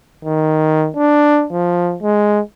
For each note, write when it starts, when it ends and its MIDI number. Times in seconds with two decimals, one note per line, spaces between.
0.25 0.89 51
0.96 1.46 62
1.52 1.96 53
2.03 2.40 56